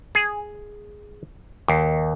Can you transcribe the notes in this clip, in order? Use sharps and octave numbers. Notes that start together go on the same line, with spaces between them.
G#4
D#2